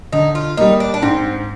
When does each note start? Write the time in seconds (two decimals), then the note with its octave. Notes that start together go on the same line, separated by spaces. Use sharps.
0.12 D3 D#4
0.35 F4
0.57 G3 A#3 D#4
0.80 D4
0.94 D4
1.02 G#2 C4